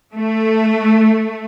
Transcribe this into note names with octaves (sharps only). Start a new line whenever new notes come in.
A3